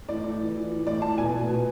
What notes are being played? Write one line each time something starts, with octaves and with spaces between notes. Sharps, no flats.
A2 D5
A2
E3
E3
E3
A2 D5
A2 A5
B2 G#5
B2
B2